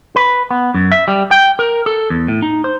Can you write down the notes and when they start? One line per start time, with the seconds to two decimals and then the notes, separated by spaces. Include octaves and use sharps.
0.16 B4
0.51 B3
0.74 F#2
0.92 E5
1.08 G3
1.31 G5
1.59 A#4
1.86 A4
2.10 E2
2.28 A2
2.42 D#4
2.64 C5